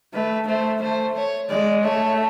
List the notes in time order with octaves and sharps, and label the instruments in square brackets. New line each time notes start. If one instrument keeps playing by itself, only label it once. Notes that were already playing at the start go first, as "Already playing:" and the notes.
[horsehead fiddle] A3 [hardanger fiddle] B4
[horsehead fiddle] A3 [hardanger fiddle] C5
[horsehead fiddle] A3 [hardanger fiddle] C5
[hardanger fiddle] C#5
[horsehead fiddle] G#3 [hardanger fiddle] D5
[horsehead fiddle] A3 [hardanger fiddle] C#5